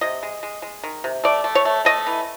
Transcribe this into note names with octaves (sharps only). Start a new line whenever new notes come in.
C3 D#5
G#3
G#3
G#3
D#3
C3
A3 D5
A3
C#5
A3
A3 D#5
E3